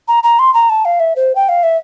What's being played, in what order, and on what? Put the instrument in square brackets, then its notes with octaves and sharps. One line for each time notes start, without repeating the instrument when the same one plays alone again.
[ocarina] A#5
A#5
C6
A#5
A5
F5
E5
C5
G5
F5
E5